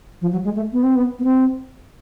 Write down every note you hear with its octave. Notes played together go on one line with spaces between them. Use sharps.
F3
F#3
G#3
A3
B3
C4
B3
B3
C4